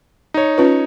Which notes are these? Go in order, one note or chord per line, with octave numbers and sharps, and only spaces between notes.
D#4 C#5
C#4 F4 B4